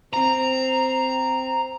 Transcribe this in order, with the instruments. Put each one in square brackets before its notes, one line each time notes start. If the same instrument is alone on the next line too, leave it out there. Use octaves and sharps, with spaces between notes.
[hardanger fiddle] C4 [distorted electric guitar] A#5